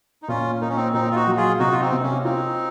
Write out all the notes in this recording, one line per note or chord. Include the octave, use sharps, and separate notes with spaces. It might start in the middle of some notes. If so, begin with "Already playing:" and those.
D#4
A#2 C#4 F4
A#3 D#4
C#4
C4 D#4
A#2 C4 D#4
F4
D#4 F#4
F#3
F4 G#4
C3 D#4 F#4
F4
C4 D#4
C3
A#3 C#4
C4 D#4 F4